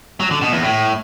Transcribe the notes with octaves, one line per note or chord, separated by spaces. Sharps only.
F#3
D3
B2
E2
A2